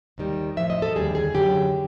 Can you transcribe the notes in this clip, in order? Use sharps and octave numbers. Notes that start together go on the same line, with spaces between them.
D#2 D#3 G3
A2 F3 E5
D#5
A4
D#2 D3 G3 G#4
G#4
F#2 D3 F#3 G4